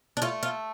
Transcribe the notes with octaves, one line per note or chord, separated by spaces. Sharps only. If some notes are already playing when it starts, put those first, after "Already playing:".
D4
A3 F4
F4